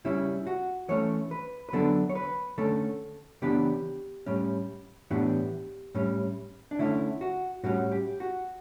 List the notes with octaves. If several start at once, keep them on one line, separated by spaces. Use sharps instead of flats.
C#3 G3 C#4 E4
F#4
E3 A3 C#4 C#5
B4
B4
D3 F#3 B3 D4 A4
C#5
B4
D3 A3 C#4 A4
C#3 E3 B3 D4 G4
A2 G3 C#4
A2 E3 B3 D4 G4
A2 G3 C#4
D4
D3 A3 C#4 E4
F#4
A2 G3 C#4 F#4
G4
F#4